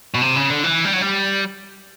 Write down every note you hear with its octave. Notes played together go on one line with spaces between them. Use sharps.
B2
C3
C#3
D3
E3
G3
F#3
G3